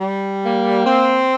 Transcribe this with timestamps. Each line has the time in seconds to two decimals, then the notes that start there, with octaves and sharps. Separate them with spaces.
0.01 G3
0.44 A#3
0.86 C4